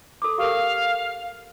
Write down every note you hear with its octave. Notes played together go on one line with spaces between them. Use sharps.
A4 D6
G4 A4 A#4 F5